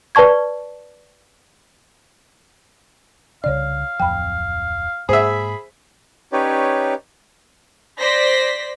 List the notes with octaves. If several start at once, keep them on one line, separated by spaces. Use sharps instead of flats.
B4 D5 A5 C#6 G#6
C2 C#3 D4 C#5 D5 F5
D1 F2 F3 G5 B5
G#2 G#3 A#3 G#4 C5 E5 F#5 B5
C#4 D#4 G4 B4 C#5 D5
C5 D5 A#6 B6